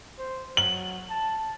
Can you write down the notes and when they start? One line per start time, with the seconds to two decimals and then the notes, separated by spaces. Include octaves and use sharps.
0.19 C5
0.57 F#3 F#7
1.10 A5